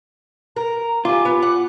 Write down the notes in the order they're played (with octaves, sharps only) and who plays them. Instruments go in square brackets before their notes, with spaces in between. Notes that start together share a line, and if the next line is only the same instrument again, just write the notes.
[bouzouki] A#4 [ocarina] A#5
[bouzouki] G3 G#5 [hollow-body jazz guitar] F4 [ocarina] D6
[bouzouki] B3
F#5